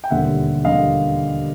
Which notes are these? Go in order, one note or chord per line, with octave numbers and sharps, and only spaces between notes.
G5
E1 D#2 D3 G3 A#3 E5 F#5
D3 G3 A#3 D#5 F5